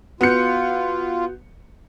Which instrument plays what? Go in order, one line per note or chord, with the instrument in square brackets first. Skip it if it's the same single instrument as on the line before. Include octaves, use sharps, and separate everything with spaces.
[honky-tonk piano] B3 C#7 [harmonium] F4 [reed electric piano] F#4 F#6 G6